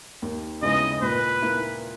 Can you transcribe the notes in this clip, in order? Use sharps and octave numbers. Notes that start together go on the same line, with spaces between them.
D#2
C#3 G#3 B3 E4 D#5
A#2 B4
A#3 E4